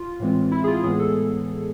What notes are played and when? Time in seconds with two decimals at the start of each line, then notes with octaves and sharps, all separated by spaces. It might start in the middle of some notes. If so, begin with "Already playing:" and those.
Already playing: F4
0.20 A2 E3 G#3 C4
0.52 E4
0.64 G#4
0.68 F4
0.83 A2 E3 G#3 B3 G#4
0.99 A4